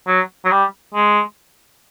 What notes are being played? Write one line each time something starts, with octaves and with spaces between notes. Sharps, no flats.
F#3
F#3
G3
G#3